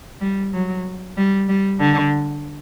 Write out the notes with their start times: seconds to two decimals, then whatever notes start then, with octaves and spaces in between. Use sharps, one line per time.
0.21 G3
0.53 F#3
1.17 G3
1.49 G3
1.80 D3